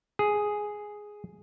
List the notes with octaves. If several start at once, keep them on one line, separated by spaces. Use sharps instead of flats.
G#4